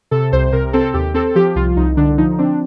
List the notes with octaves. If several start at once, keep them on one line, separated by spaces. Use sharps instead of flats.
C3 A4
C2 C5
C3 A#4
C4 A4
D#2 G4
C4 A4
F3 G4
C2 F4
C2 D#4
D3 D4
F3 D#4
C4 D4